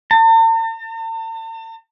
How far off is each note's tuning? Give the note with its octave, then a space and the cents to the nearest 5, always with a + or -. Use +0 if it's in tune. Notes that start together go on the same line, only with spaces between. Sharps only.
A5 +45